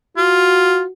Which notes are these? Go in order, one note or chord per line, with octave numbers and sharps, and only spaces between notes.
F4 F#4